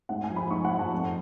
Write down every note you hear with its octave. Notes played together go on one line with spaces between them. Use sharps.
G#2 F#5
G#5
F3
B5
G#2 C#6
F#5
F3
A5
F2